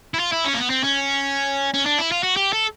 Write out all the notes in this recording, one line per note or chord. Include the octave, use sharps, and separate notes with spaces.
E4
F4
E4
C#4
A#3
B3
C4
C#4
C#4
D4
E4
F4
F#4
G4
A4